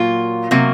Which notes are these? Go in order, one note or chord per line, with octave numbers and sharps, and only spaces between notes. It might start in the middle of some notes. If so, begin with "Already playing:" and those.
Already playing: A#2 F#3 A#3 F4
C3 F#3 A#3